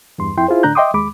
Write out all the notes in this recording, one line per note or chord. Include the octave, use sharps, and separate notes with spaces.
E2 G2 C6
F2 E4 G5 C6
E4 F4 G#4 C5
A2 D3 D4 A#5 F#6 G6
D#5 E5 G5 C6 D6 D#6
D#2 G#3 B5 D6